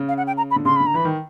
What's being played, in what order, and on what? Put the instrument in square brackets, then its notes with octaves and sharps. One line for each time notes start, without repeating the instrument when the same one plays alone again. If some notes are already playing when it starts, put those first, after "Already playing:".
Already playing: [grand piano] C#3
[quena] F5
F#5
G5
A#5
B5
[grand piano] D3
[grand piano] C#3 [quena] C6
[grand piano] D3 [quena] B5
[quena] A#5
[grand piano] E3 [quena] B5
[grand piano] D#3